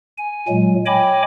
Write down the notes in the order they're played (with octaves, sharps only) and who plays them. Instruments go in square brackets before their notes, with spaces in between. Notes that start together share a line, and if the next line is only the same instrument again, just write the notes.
[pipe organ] G#5
A#2 F#3 G#3
C#5 D#5 G5 G#5 B5 D6